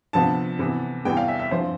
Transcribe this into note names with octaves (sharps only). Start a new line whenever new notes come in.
D2 C3 F3 B3 A5
C3 E3 B3
E2 C3 E3 G3 B3 G5
F5
E5
E5
G2 F3 C4 F4 C5